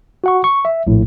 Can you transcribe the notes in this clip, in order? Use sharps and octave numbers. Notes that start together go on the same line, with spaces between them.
F#4 F#5 C#6
C#6
E5
A#1 A2